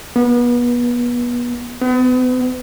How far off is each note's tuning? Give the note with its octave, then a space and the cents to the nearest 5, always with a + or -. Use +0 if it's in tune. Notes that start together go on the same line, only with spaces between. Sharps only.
B3 -30
B3 +40